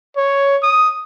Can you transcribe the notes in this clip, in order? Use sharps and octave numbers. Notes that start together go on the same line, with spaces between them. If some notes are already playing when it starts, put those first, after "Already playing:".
C#5
D#6